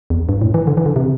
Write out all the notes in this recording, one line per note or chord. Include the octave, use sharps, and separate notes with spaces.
E2
G2
A2
E3
D3
E3
D3
C3